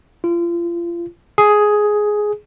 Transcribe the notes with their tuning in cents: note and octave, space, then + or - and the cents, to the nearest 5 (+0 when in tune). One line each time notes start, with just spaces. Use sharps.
F4 -30
G#4 +5